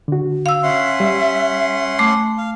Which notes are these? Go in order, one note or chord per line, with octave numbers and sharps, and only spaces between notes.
D3 F#4
F5 E6
C#4 E5 F#5 C6
G3
A3 D6
F5